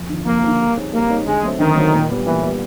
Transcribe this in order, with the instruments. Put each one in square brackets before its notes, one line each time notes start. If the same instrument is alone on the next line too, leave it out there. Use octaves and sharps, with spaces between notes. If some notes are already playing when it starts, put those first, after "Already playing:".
Already playing: [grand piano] F2
D3 F3
[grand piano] F2 [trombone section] A#3
[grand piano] D3 F3
G3
C4 D#4 G#4 C#5
[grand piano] G3 [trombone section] A#3
[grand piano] C4 D#4 G#4 C#5
[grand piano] D3 [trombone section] G#3
[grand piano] F#3 A3 C4
[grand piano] D3 [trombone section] D#3
[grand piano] F#3 A3 C4
A#2
G3 B3
[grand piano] A#2 [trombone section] E3
[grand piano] G3 B3